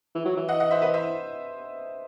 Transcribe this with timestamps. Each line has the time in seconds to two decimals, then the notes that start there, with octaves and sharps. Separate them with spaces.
0.15 E3
0.25 F#3
0.37 E3
0.48 D#5 F#5
0.60 D#5 F#5
0.71 C5 E5
0.82 B4 D#5
0.94 C5 E5